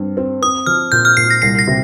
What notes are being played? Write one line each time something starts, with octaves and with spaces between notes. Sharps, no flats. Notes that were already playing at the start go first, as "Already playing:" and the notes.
Already playing: G2 C4
C4
C4 D#6
F3 F6
A#2 G6
F6
A#2 C7
A#6
C2 C7
A#6
C3